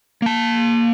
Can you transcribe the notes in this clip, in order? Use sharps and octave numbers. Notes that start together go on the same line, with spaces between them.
A#3 A5